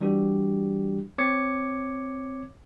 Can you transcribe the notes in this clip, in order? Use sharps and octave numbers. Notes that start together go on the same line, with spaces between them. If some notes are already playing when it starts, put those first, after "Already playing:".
E3 G3 D4 F#4 G4
C4 C#5 D6 G#6 C#7